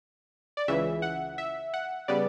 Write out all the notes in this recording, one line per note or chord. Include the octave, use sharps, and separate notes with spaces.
D5
C#2 C#3 E3 E5
F#5
E5
F#5
C#3 G3 B3 D5